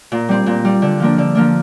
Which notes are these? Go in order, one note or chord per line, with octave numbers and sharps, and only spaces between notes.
A#2
G3 C4
A#2
G3 C4
D3
F3 A#3 D4
D3
F3 A#3 D4